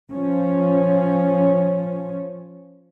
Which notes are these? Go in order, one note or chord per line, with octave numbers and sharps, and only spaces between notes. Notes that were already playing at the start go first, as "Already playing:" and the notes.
F3 C#4